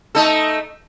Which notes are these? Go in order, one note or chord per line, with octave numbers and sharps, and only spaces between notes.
A3 D#4 A4